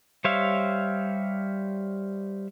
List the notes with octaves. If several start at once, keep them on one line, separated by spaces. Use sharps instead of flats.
G3 C5 C#5 E5 F5